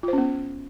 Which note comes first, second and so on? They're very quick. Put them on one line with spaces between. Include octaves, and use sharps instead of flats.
F4 C5 C#4 B3